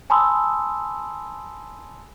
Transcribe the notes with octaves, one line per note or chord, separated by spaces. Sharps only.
G#5 A5 B5 C6 D#6 E6